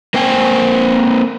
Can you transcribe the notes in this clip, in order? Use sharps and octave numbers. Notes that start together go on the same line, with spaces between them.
A#3 C4 C5 G5 G#5